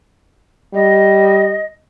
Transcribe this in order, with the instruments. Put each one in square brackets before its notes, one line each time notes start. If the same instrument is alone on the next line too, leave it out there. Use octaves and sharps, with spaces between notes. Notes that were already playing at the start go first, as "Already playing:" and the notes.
[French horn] G3 [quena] D#5